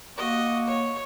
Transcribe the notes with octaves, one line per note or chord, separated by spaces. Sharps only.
A#3 F#4 D#5
C#5